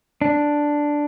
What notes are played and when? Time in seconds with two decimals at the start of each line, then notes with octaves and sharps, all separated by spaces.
0.21 D4